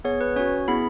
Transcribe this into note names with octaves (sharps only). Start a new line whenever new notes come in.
B3 G#4 C#5
B4
C#4 F#4 C#5
B3 E4 G#4 B5